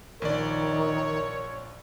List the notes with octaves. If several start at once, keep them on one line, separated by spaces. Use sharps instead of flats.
A#1 D#3 A#4 C#5 D5